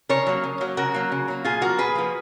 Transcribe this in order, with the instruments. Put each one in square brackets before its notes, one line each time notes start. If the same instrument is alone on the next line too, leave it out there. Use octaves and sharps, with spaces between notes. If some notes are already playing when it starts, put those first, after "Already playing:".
[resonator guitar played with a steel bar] C#3 A#4 C#5
F#3 A#3
C#3
F#3 A#3
C#3 F#4 A#4
F#3 A#3
C#3
F#3 A#3
A#2 F4 G#4
F3 A#3 F#4 A#4
A#2 G#4 B4
F3 A#3